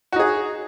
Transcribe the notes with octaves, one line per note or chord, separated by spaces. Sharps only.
D#4 F#4 G#4